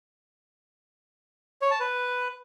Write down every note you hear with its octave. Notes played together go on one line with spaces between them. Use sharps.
C#5
A5
B4